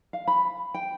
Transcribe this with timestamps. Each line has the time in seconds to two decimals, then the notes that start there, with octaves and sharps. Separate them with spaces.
0.13 F5
0.28 B5
0.74 G5